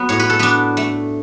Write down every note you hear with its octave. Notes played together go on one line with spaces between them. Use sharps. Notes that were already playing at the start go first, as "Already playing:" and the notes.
Already playing: F#3 B3
A2 C#5
B4
A4
B3 D4 B4
A3